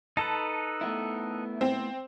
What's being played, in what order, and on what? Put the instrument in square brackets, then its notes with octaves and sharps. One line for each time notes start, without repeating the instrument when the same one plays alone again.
[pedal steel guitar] D#4 A4 B4 [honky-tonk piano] A5
[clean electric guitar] A3 B3 E4
[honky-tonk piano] C4